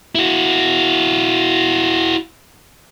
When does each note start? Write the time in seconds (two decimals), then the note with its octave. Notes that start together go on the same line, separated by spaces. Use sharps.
0.15 E4 F#4